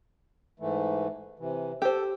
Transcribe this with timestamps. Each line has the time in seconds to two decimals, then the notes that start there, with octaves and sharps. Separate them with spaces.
0.60 G#2 E3 A3
1.39 C3 E3
1.82 G4 A4 C5